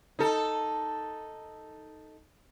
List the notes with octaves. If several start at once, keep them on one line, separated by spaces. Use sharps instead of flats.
D#4 A4